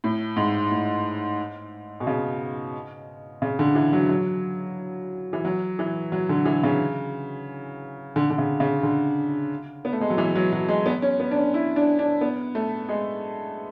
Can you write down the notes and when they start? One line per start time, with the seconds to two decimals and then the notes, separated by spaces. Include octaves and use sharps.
0.04 A2
0.36 G#2
0.71 A2
2.00 B2
2.07 C#3
3.42 C#3
3.59 D3
3.75 E3
3.93 F#3
4.09 F#3
5.33 E3
5.45 F#3
5.79 E3
6.12 F#3
6.29 D3
6.45 E3
6.63 C#3
8.16 D3
8.30 D3
8.38 C#3
8.60 C#3
8.83 D3
9.85 B3
9.93 A3
10.01 G#3
10.10 F#3
10.18 E3
10.35 F#3
10.53 F#3
10.68 G#3
10.86 B3
11.02 C#4
11.20 B3
11.31 D4
11.36 C#4
11.54 E4
11.76 D4
11.99 D4
12.21 B3
12.55 A3
12.89 G#3